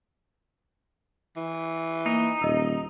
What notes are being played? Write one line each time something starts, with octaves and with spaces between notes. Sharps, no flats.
E3
A#3 D#4
D#1 D#5 E6